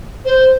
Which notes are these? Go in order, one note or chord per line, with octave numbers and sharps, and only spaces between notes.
C5